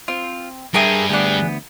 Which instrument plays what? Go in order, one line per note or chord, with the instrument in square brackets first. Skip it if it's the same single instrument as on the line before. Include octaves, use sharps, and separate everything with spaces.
[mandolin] C4 [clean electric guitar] F4
[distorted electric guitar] G2 [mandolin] G#4 E5 D#6 [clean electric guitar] A#4 G5 G#5
[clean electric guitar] D2 B3 [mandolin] D4 G#4